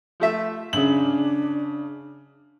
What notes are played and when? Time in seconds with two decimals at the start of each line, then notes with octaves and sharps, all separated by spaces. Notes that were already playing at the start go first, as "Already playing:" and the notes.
0.20 F3 A3 E5
0.73 F#2 C#3 D4 F#7